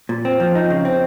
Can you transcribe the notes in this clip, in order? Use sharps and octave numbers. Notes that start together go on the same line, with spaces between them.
A#2
C4
F3
D#4
C#3
C4